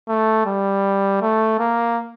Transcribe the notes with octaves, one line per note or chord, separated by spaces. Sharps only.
A3
G3
A3
A#3